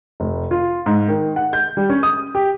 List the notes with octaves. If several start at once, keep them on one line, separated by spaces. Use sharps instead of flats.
F1
F4
G#2
D#3
F#5
G6
G3
C#4
D#6
G4